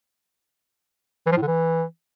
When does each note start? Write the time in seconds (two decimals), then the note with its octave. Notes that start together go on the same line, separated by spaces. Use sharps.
1.26 E3
1.31 F3
1.37 A2
1.42 D3
1.47 E3